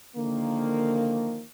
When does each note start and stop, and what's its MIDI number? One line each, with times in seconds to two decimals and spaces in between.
0.16 1.44 50
0.16 1.44 51
0.16 1.44 53
0.16 1.44 58